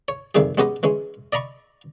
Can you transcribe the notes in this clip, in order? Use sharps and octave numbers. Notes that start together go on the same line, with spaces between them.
C#5
F2 C3 D#3 G3 G#4
G#3 B3 C#4 G4 B4 D#5
E3 G#3 C#4
D5 D#5 A#5 B5 C#6